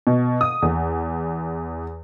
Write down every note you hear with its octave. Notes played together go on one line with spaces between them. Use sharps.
B2
D#6
E2